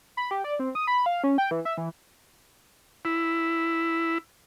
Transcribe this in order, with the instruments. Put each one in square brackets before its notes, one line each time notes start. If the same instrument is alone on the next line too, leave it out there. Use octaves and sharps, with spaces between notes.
[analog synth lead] B5
G4
D5
C4
D#6
B5
F5
C#4
G5
E3
E5
E3
[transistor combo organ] E4